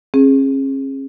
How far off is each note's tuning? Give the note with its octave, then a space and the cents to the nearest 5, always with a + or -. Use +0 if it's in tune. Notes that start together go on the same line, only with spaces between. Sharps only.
C#4 -40 G#4 -5